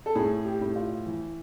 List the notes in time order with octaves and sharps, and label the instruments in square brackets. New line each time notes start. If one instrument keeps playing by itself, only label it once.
[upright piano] A4
A2 G#4
G4
A2
F4
E3